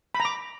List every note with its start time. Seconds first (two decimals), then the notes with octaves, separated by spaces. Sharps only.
0.15 B5
0.20 A#5
0.25 D6